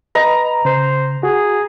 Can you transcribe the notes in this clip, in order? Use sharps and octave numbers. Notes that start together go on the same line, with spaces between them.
B4 D#5 A#5 B5
C#3 C5
F#4 G#4